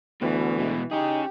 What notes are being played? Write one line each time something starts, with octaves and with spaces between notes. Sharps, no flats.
D2 B2 E3
B2 G#3
C#4 D#4 G4 G#4